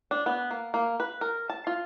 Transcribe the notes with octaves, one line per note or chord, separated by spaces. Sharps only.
D4
B3
A#3
A#3
B4
A#4
A5
F4